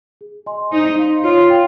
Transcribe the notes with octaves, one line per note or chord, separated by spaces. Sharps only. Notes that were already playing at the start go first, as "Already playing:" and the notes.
G#4
D#5 G#5 C6
D#4 C5
F5 C6
F4 C#5
G5